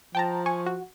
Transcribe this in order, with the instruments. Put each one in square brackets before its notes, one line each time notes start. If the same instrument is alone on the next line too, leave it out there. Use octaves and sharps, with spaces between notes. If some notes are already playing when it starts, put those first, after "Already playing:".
[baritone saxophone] F3 [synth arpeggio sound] G5 A5 A#5
[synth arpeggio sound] G#5 C#6
F#4